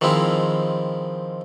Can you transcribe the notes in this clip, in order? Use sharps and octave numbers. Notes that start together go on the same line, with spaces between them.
D#3 F3 G#3 C4 E4